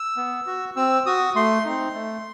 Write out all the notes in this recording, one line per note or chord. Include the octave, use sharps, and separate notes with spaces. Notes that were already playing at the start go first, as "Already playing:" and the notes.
Already playing: E6
B3
F#4
C4 E6
F#4 D#6
A3 C6
C4 D#4
A3